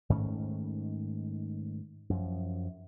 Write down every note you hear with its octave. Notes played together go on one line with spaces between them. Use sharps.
G#2 D#3 A3 C#4
F#2 F3